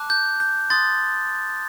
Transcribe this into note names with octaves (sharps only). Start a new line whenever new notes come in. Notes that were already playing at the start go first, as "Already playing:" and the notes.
Already playing: A5 D6 F#6
G6
G6
C6 D#6 F#6 A6